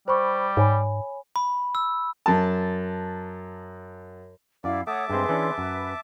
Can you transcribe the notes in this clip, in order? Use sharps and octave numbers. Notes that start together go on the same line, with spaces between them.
G3 C5 B5 C#6
G#2 C#5 G#5 B5
B5
E6
F#2 A5
F#2 E4 D5 F5
A3 C#5 E5 F#5 A5 D6 D#6
G2 G#3 C4 G#4 B4 C6
E3 C#4 D4
F#2 B4